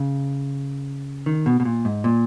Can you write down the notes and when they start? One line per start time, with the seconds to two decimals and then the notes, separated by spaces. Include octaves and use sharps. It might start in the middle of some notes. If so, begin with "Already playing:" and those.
Already playing: C#3
1.26 D#3
1.46 B2
1.60 B2
1.65 A#2
1.85 G#2
2.04 A#2